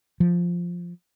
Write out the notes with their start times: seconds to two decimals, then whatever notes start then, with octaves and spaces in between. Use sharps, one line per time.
0.20 F3